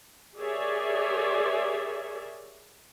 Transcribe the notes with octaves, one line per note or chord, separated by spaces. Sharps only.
G4 G#4 A#4 C#5 D5 E5